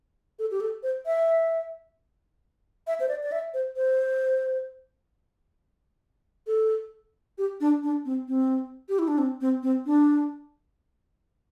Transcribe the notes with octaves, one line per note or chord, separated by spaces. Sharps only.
A4
G4
A4
C5
E5
E5
C5
D5
D5
E5
C5
C5
A4
G4
D4
D4
C4
C4
G4
E4
D4
C4
C4
C4
D4